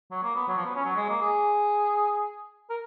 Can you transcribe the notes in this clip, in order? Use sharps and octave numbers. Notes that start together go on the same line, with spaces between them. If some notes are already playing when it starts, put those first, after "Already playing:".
F#3
A#3
B3
F#3
F3
B3
C#4
F#3
G#3
A#3
G#4
A#4